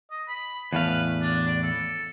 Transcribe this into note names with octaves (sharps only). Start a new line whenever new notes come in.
D#5
B5
E2 A2 B4 F5
D4
D5
A4